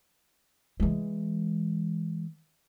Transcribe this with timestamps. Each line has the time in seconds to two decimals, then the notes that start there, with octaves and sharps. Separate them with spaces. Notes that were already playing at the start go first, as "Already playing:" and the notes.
0.80 E3 G#3